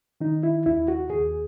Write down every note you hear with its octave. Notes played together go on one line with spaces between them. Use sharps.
D#3 D#4
E4
D#2 E4
F#4
D#2 G#4